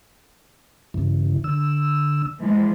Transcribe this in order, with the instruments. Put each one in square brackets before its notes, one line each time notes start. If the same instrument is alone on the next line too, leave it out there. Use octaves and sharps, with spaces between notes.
[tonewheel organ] G2 C#3 E3
D3 E6
[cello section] E3 F3 G#3